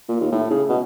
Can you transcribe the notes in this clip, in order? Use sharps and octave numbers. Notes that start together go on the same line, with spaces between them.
A#2
D#2
A2
C#3
B2